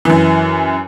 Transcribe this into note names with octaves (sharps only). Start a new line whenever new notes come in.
F#2 E3